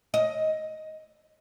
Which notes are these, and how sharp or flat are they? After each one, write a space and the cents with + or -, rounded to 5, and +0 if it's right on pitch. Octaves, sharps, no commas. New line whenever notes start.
D#5 +10